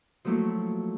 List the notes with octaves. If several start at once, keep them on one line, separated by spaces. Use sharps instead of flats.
F3 F#3 A3 A#3 E4